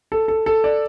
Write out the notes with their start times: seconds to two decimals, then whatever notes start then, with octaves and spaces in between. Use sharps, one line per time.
0.12 A4
0.28 A4
0.46 A4
0.64 D5